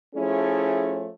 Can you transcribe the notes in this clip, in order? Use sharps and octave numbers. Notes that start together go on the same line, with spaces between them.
F3 A3 C#4 E4 G#4 C#5